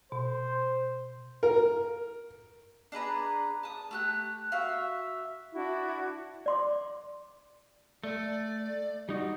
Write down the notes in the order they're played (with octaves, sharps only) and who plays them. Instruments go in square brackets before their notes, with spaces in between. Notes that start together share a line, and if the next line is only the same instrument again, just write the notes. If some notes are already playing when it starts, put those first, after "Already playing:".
[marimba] B2 [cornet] C5
[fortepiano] A#4
[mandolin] D4 G#4 B4 A#5
A5 D#6
A3 G4 F#6
F#4 E5 F5
[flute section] D4 E4 F#4
[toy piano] D5 C6 D6
[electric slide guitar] A3 [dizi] D5
[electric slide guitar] G3 D#4 F#4